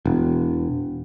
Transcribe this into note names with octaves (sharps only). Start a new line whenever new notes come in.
E1